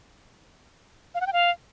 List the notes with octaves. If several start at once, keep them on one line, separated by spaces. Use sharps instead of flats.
F5
F#5
G5
F5